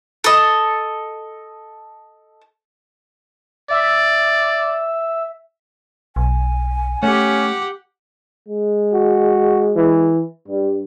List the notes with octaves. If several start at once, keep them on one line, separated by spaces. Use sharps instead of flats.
A4 D#5
D5 E5
B1 G#5
A3 C#4 G4 F#5
G#3
F#4
E3
G2 G3